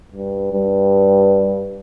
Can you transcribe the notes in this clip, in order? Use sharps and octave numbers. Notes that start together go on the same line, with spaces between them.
G2
G2